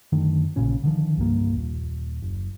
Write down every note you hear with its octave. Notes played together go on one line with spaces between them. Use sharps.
F#2 D3 D#3 A3
A#1 A#2 C#3 C#4
D3 D#3 F3
C2 G2 A#3
D#1
F#1